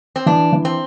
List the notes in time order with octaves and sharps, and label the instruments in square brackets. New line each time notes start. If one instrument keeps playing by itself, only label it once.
[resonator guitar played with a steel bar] C4
[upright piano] E3 [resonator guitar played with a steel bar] D4
[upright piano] E3
[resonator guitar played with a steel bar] C4